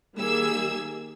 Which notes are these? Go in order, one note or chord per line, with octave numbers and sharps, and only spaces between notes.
D#3 G3 A#3 G#4 E6 G#6